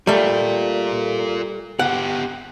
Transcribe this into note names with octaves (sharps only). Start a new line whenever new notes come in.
G3 A3 F4 A#4
B3 G4 F#5